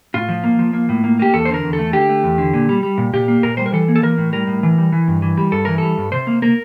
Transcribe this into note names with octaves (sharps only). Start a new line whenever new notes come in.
A2 F4
F3
A#3
F3
A#3
A2
A#3
A#3 G4
E2 A4
C5
D3 A#4
E2
A4
A3
D3 G4
A3
E2
D3
A#2
G3
G3
A#2
A#2 G4
A#3
A#2 A#4
G3 C5
A#4
E3 A4
A#3
A4
E3 A#4
A2
G3 A#4
A2
E3
G3
E3
G2
E3
G3
G2 A4
E3 A#4
G3 A4
G2
C3 C5
A#3
A#3 A#4